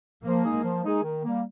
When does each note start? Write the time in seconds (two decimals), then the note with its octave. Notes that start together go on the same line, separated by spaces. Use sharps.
0.23 F3 A#3
0.43 G#3 D#4 G#4
0.63 F3
0.83 G#3 D#4 G#4
1.03 D#3
1.23 G3 A#3